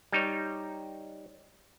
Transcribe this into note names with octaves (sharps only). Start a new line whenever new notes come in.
G3 D#4 C#5